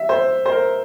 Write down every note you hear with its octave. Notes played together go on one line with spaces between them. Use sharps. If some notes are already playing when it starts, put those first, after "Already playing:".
Already playing: E5
C5
C5
A#4